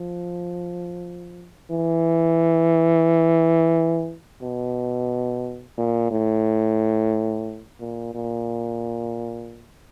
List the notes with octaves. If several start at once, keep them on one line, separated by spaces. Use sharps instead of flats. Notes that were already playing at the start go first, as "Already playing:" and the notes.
Already playing: F3
E3
B2
A#2
A2
A#2
A#2